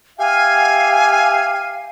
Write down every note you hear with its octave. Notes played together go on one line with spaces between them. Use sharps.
G4 E5 F5 G#5